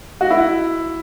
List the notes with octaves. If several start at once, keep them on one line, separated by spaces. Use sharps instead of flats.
F#4
E4